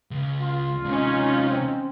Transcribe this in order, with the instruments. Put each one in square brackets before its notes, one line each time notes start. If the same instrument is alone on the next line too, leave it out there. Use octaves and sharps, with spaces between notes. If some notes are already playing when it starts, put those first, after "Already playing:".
[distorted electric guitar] C#2
[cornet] F4
[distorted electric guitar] C3 G#3 [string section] C#4 D#4
[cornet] C4